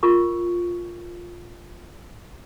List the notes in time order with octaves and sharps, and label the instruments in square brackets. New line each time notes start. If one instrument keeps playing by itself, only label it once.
[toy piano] F4 A#4 C#6